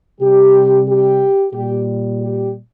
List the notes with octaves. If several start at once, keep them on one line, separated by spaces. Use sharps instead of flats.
C3 G3 G4
G4
A#2 G3 G4
G4